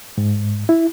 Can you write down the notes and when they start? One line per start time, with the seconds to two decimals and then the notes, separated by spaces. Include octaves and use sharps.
0.18 G#2
0.69 E4